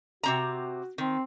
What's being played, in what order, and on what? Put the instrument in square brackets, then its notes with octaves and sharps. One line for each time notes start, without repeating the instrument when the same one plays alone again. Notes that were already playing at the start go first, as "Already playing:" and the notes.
[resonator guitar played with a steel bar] C3 C4 A#5 [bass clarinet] F#4
[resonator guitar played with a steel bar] D#3 [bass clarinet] C4